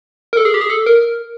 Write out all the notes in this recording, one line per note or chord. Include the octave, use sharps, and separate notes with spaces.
A#4
A4
G#4
G4
G#4
A4
A#4